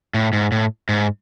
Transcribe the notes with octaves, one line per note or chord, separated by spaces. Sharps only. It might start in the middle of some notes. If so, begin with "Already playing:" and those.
A2
G#2
A2
G#2